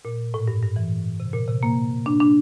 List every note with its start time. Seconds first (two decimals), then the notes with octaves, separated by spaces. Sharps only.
0.05 A#2
0.34 A2
0.48 G2
0.63 G2
0.76 E3
1.20 C3
1.33 A#2
1.48 C3
1.63 A#3
2.06 D4
2.20 D4